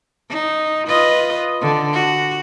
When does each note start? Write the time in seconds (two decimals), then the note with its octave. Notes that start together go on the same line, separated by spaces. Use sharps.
0.30 D#4
0.88 F4 B4 D#5
1.61 D3
1.93 F#4